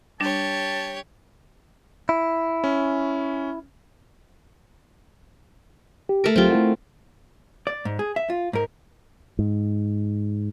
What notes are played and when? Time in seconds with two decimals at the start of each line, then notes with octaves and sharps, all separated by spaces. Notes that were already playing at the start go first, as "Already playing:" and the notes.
0.20 G3 D4 G4 C#5 A5
2.09 E4
2.64 C#4
6.09 G4
6.24 A3 A#4
6.36 C#2 F#3 C4 F4 G4
6.50 A3 E4 F#5
7.67 D5
7.85 G#2
7.99 G#4
8.16 E5
8.30 F4
8.53 G#2 A#4
9.39 G#2